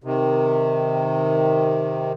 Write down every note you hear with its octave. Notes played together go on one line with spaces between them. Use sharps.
C3 D#3